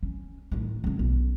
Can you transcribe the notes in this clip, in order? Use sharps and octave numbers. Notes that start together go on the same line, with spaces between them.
C#4
A1 D#3
C#2 E3
B1